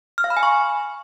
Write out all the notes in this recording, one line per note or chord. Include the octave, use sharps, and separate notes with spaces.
F6
F5
B5
G#5
C#6